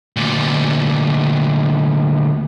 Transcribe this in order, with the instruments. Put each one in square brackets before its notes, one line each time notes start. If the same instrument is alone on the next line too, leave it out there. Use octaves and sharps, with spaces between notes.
[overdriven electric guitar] D2 A#2